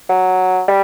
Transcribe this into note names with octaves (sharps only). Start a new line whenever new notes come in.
F#3
G3